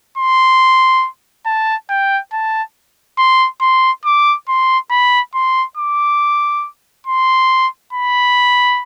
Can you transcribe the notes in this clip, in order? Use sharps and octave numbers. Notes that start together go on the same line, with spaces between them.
C6
A5
G5
A5
C6
C6
D6
C6
B5
C6
D6
C6
B5